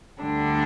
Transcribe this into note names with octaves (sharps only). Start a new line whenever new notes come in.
D2 D3 G3 D4